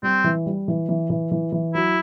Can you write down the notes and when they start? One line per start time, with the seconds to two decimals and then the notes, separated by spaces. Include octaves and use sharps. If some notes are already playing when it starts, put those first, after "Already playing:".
0.03 G3 C4
0.24 E3
0.46 G3
0.68 E3
0.89 E3
1.10 E3
1.31 E3
1.52 E3
1.74 F#3 E4